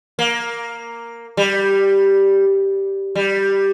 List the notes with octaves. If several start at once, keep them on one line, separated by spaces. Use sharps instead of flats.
A#3
G3
G3